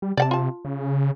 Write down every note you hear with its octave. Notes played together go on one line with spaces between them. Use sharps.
G3
C3 D5 F#5 A5
F4 A5
C#3